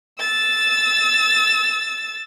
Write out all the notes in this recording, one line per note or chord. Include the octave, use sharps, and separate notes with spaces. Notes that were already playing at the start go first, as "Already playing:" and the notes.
E6 A6